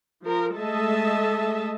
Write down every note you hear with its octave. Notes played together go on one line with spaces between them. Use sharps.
F3 A#4
G#3 A3 A4 D#5 E5 A5